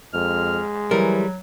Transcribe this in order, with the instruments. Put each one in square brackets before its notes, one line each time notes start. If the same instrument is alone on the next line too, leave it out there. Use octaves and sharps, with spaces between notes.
[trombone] F2 [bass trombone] G#3 [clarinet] F6
[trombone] E3 [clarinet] F#3 [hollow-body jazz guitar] G3 A#4